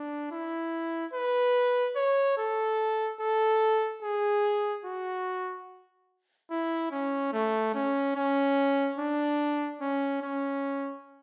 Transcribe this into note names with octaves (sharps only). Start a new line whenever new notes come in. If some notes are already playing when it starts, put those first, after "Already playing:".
Already playing: D4
E4
B4
C#5
A4
A4
G#4
F#4
E4
C#4
A3
C#4
C#4
D4
C#4
C#4